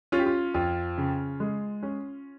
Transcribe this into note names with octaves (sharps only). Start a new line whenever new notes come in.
C#4 F4
G4
F4
F2 F4
C#3
G#3
C#4